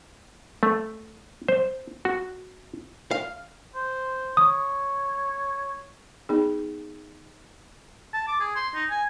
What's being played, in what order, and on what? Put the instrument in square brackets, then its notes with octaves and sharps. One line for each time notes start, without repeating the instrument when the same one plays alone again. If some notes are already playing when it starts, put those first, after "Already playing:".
[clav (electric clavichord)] A3
C5
F#4
[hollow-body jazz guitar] F5
[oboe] C5
[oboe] C#5 [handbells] D#6
[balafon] B3 D#4 G#4
[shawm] A5
D6
G#4
C6
D#4
G#5